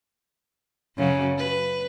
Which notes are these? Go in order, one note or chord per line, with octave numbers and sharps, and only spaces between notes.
F#2 C#3 F#3
B4